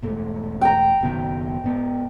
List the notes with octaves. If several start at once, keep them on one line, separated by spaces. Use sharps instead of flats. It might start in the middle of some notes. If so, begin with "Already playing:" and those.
E1 G#2 A3
G5 A#5
F#1 B2 D#3
G#2 B3